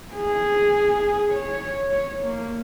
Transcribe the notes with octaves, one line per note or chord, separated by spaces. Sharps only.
G#4
C#5
C#5
A#3